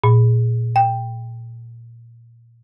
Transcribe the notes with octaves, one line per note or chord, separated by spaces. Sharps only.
A#2
G5